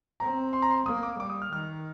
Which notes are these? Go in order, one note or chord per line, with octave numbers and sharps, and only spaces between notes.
C4 A#5
C6
A#5
C6
A#3 D#6
D6
G3 D6
D#6
F6
D#3 F6